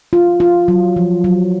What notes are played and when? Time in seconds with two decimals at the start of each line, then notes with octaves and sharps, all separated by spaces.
0.13 F4
0.40 F4
0.68 F#3
0.96 F3
1.24 F#3